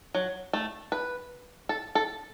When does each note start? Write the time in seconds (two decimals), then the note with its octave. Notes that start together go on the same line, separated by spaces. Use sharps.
0.15 F#3
0.53 A3
0.92 B4
1.69 A4
1.95 A4